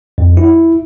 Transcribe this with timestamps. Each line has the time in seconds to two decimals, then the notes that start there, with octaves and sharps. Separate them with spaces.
0.18 F2
0.37 E4